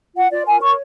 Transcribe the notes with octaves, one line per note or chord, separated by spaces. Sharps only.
F4 F#5
F4 D5
A#4 G#5
C#5 C#6